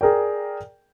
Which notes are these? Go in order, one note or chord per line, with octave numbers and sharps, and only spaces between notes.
G#4 A#4 D5 G5